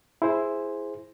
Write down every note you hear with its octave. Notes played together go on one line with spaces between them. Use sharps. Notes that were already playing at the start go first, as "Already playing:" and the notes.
E4 G#4 C5